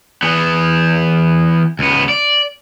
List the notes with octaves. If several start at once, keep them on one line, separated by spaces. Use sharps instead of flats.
E3 B3
C#2 B3
D5